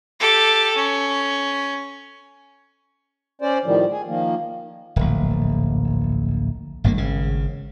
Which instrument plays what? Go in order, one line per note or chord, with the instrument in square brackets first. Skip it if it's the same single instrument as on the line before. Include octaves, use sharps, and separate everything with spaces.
[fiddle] G4 A4
C#4
[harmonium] C#4 C5 D5
A2 D#3 F3 G3
G#4
D#3 F3 A#3
[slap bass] D1 A#1
G#1 G2 F3 A#3
G#1 C#3